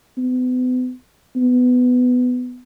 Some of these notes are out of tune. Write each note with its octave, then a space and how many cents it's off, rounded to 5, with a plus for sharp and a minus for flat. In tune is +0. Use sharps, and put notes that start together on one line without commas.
B3 +40
B3 +15